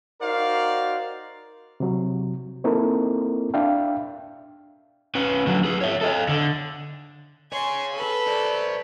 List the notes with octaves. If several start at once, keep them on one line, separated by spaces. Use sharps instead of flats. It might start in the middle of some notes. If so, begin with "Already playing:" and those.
D#4 F#4 A#4 C5 D5 F5
C3 F#3
A#3 C4 D#4 E4 A4 A#4
D4 E5 F5 G5
C#4 B4
D3 F#3
G#4 B4
C#5 E5
A4 D#5
D3
G#4 C#5 G#5 C6
A4 B4
C5 D5